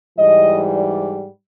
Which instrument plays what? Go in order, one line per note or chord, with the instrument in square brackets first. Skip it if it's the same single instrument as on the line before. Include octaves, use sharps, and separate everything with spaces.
[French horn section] G#2 E3 G3 D#5
D5